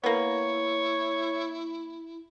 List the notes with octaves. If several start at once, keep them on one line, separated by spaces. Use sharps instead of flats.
A#3 B3 E4 C#5